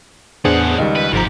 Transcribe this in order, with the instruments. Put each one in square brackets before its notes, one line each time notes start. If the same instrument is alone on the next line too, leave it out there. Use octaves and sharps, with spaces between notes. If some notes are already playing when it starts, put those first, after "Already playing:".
[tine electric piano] E2 B3 [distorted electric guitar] A2 F#5 [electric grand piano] D4 G#4 C5
[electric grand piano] C#2 D#3 G3 [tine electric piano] D#5
[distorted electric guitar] B4
[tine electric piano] G1 F3 A#5 [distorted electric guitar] G#2 G4